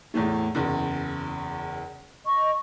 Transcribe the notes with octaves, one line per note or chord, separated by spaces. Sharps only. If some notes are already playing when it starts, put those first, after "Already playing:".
E2 A2 A3
F#1 E2
D#5 C#6